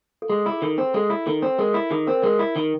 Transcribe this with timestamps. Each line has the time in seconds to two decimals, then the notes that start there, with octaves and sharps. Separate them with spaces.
0.22 A4
0.30 G#3 G#4
0.46 E4
0.52 G#4
0.62 D#3 A4
0.78 C4
0.94 G#3 A4
1.10 E4
1.27 D#3 A4
1.42 C4
1.59 G#3 A#4
1.74 E4
1.91 D#3 G#4
2.07 C4 A#4
2.23 G#3 A#4
2.39 E4
2.56 D#3